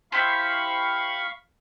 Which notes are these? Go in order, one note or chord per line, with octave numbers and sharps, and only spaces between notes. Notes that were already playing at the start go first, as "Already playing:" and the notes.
E4 G4 C5 F5 B5 C#6